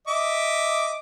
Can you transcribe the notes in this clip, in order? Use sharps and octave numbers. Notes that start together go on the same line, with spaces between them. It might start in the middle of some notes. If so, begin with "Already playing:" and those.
D#5 E5 D6